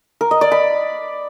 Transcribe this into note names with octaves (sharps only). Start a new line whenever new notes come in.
A#4
D#5
D5
B5